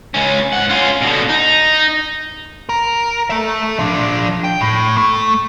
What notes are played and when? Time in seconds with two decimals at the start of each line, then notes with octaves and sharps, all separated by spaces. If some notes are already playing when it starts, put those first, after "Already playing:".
0.14 C#2 C#4
0.53 G#2 F#5
0.69 C#4 F4
1.01 B2 D3
1.29 D#4
2.69 A#4
3.30 A4 E5
3.79 F3 D4
4.44 G5
4.61 A2
4.98 A3